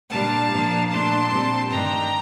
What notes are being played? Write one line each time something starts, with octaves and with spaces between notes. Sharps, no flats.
A#2 G3 A#3 D4 F5 A5
A#2 F3 A#3 D4
A#2 A3 D4 A5 C6
A#2 G3 C4
G2 D#3 A3 D4 G5 A#5